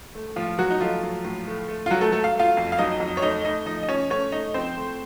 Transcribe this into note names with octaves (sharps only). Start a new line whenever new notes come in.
A3
A2 F3 F4
F#3 F#4
D#4
F3 A3 F4
F#3
A2
A3
A3
F4
F#3 A3 F#4
A3 A4
F#3 A3 A4
F5
A3 F4 F5
F2
F5
F#3 D#4 D#5
F2
C#5
A3 D#4 D#5
A3 D#4 D#5
F3 D#4 D#5
D#5
F3 C#4 C#5
A3 C#4 C#5
A3 D#4 D#5
F3 C4 C5
A3